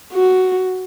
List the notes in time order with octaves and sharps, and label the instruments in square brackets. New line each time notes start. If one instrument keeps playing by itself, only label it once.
[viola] F#4